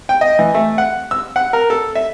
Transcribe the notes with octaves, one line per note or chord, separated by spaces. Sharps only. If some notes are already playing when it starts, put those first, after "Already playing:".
G5
D#5
E3
A3
F#5
E6
F#5
A#4
A4
E5